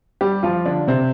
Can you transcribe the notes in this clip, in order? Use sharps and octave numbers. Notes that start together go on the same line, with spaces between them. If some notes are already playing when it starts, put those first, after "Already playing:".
G3 G4
F3 F4
D3 D4
C3 C4